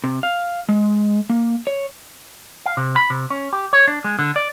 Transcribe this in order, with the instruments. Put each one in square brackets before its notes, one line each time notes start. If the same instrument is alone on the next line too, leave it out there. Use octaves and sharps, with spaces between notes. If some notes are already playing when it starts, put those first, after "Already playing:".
[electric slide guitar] C3
F5
G#3
A#3
C#5
[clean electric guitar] F5
C3
B5
C3
C#4
G4
C#5
D4
G#3
D3
D5